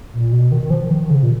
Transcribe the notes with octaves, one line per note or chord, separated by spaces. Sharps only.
A#2
B2
D#3
D#3
F3
D#3
C#3
A#2